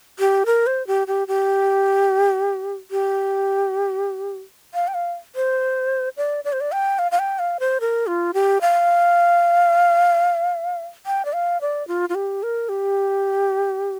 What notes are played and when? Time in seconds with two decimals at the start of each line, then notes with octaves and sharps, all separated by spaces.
0.19 G4
0.46 A#4
0.67 C5
0.87 G4
1.07 G4
1.28 G4
2.91 G4
4.74 F5
4.88 G5
4.94 F5
5.36 C5
6.17 D5
6.44 D5
6.53 C5
6.61 D5
6.72 G5
6.99 F5
7.12 F5
7.19 G5
7.39 F5
7.60 C5
7.81 A#4
8.07 F4
8.34 G4
8.61 F5
11.06 G5
11.25 D5
11.33 F5
11.61 D5
11.88 F4
12.09 F4
12.15 G4
12.43 A#4
12.69 G4